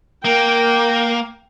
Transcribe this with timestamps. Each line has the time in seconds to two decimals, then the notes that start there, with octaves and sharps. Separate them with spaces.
0.25 A#3 A#4 G5